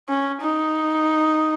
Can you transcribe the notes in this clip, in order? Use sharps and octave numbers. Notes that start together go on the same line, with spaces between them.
C#4
D#4